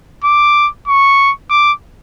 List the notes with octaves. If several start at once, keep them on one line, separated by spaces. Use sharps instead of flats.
D6
C#6
D6